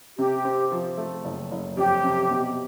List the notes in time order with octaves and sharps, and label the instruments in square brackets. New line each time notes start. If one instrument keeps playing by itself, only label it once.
[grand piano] C3 [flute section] G4
[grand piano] C4
F3
A3
F#1
F#1
[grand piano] F2 [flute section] G4
[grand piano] C3
B2